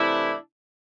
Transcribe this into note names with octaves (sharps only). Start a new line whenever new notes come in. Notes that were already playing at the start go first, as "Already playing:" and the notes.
Already playing: C3 E3 A3 D4 E4